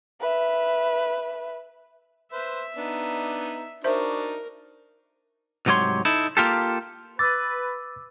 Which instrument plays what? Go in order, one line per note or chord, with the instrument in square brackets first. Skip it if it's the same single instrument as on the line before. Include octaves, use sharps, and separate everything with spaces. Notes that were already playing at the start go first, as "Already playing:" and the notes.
[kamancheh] B4 E5
[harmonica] B4 C5 [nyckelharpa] E5
[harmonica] B3 D4 D#4
[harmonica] D4 D#4 F#4 [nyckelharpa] A#4 [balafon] C5 E5
[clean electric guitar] C2 G#2 F#3 G4 C#5 C6
D#4 E4 A4
A#3 F4 G4 A4
[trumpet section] B4 [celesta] D6 E6 [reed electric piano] A6